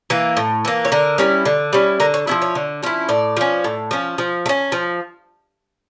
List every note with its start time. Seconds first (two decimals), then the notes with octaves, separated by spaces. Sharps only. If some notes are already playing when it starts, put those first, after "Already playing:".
0.10 E3 A#3
0.37 A2
0.65 E3 A#3
0.85 C#5
0.92 D3 A#4
1.18 G3 C#4 E4
1.45 D3
1.73 G3 C#4 E4
2.00 D3 A#4
2.14 C#5
2.27 F3 C#4 E4 E5
2.42 C#5
2.55 D3
2.83 F3 C#4 E4
3.09 A2 D5
3.37 F3 C#4
3.64 A2
3.91 F3 C#4
4.18 F3
4.46 A3
4.49 C#4
4.72 F3